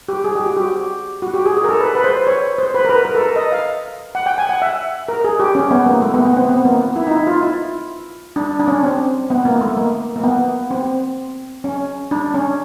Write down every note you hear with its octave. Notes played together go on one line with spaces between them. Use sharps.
G4
G#4
G4
F#4
G4
F#4
G4
G#4
G#4
A#4
A4
B4
B4
C5
C#5
C5
B4
A#4
B4
A#4
A4
A#4
D#5
F5
F#5
G5
G#5
F#5
E5
A#4
G#4
G4
C#4
B3
A#3
A3
B3
B3
C4
B3
A#3
E4
D#4
E4
F4
E4
D4
D4
C#4
C4
B3
A#3
A3
A#3
A#3
B3
C4
C#4
D4
C#4